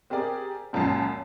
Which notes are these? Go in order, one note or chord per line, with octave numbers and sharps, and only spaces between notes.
C4 G4 G#4 A#4 D5
C#2 F#2 A#2 A5 C7